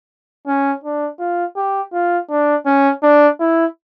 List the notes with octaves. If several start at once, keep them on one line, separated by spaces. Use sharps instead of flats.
C#4
D4
F4
G4
F4
D4
C#4
D4
E4